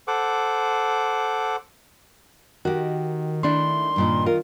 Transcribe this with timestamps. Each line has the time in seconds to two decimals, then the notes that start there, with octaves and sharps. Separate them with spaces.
0.08 A4 C5 F#5 D6
2.65 D#3 F#4 G4
3.43 A3 D4 E4 C6
3.96 G2 A#2 D#4
4.26 F4 A#4